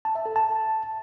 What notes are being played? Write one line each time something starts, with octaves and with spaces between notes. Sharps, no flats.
A5
E5
A4
A5